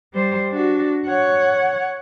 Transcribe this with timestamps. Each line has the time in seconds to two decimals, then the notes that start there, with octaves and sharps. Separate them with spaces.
0.14 G3 C5
0.49 D4 F#4
1.05 C#5 F#5